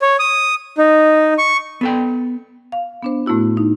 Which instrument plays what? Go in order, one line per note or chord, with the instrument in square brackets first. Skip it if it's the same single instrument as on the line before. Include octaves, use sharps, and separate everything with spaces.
[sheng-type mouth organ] C#5
D#6
D#4
C#6
[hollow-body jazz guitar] B3 A4 G5
[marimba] F5
B3 D4 C5
A2 A3 B3 E4 F#4
D#4